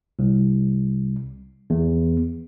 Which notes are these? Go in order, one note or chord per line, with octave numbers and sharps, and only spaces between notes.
C2
E2